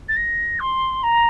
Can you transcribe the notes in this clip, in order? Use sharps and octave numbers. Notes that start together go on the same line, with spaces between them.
A6
A#6
C6
A#5